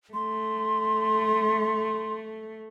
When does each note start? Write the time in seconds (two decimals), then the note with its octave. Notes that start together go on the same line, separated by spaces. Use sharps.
0.14 A3 C6